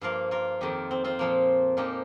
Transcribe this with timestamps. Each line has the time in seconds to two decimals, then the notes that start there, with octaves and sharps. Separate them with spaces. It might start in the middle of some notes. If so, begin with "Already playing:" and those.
0.01 G2 F3 A#3 F4 A#4
0.31 F4 A#4
0.61 F2 D#3 A#3 D#4 G4
0.91 C4
1.04 C4 F4
1.19 A#2 F3 A#3
1.77 A#2 F3 A#3 D#4 G4